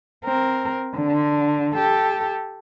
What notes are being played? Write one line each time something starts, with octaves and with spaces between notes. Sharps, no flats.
C4 A#4
D3
G4 A4